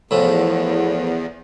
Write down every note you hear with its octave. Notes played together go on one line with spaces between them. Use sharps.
E2 A2 F3